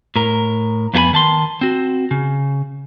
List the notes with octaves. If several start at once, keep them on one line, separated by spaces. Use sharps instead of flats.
A2 A#4
F2 B3 E4 A4 G#5 B5
D#3 A5 C6
C4 F#4
C#3